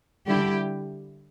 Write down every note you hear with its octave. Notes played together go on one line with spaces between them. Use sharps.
D3 G3 E4 G4